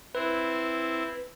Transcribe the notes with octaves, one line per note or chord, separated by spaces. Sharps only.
C4 E4 B4